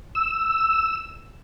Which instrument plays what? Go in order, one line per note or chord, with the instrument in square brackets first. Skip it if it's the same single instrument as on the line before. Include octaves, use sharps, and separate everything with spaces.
[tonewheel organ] E6